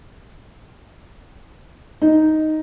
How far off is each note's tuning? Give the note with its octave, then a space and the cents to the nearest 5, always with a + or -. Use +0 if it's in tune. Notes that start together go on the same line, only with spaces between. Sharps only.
D#4 +0